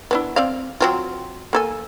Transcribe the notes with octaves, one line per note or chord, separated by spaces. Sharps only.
B3 D4 E4
C4 D5 F5
F#3 C4 F4
A#3 A4 G#5